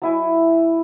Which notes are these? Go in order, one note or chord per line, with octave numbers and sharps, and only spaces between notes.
F#3 E4 G#5